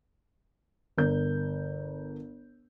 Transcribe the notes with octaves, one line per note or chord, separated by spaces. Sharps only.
G1 A#4 G6